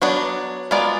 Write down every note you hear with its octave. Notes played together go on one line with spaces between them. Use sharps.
F#3 B3 D4 F#4
G#3 B3 F4 A#4 D5